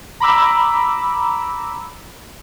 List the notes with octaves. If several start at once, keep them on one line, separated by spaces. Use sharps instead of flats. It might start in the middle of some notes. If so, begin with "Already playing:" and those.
A#5 B5 D6 E6